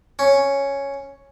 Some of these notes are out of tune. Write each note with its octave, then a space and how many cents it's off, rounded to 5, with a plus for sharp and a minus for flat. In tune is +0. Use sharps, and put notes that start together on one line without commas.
C#4 +0